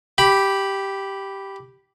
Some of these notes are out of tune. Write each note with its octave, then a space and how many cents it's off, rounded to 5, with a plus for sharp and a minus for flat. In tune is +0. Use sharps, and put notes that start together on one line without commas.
G4 -5 B5 +0